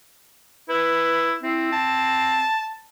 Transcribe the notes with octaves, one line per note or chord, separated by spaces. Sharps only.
E4 B4
C4 E4
A5